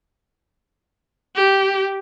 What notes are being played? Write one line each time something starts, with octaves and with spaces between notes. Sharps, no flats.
G4